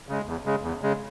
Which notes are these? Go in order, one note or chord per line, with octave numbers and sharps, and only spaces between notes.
C#3 G#3
E2
C#3 G#3
E2
C#3 G#3